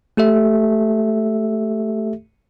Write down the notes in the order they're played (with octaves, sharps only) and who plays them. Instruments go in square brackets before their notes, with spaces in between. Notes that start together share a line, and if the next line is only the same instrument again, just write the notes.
[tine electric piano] A3 G4 A4 E5